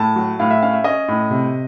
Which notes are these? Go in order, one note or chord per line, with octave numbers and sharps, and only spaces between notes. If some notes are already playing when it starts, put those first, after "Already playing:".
Already playing: A2 A5
F#3
A2 F5
E5
C#4 F5
E5
C#4 D#5
A2
C3